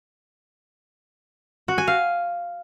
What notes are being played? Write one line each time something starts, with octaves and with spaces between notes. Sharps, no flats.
F#4
G#5
F5